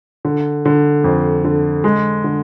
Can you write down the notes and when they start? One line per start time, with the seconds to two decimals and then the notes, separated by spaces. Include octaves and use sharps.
0.25 D3
0.65 D3
1.04 F2
1.45 D3
1.84 G#3
2.24 D3